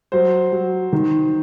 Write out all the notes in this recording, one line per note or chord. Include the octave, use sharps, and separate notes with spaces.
F#3 C5
F#3
D#3